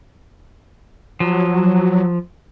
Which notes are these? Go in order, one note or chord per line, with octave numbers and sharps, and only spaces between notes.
F3 F#3